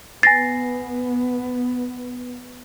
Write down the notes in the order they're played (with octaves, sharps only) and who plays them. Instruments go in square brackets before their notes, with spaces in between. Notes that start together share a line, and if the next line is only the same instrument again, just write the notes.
[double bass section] B3 [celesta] G#5 A#6 C7 [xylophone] A6